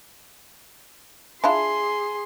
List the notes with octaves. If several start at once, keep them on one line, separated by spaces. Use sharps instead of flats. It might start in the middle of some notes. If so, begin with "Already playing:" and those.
D4 E4 F4 G#4 C6